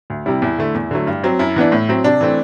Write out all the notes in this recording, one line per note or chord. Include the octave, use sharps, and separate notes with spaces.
D2
C3 G3 E4
E2 E4
D3 A3
E2
D3 F#3 A3
G2
F#3 C4
F#2 E4
E3 B3 D4
A2
F#3 C4
C3 D4
E3 A3 C4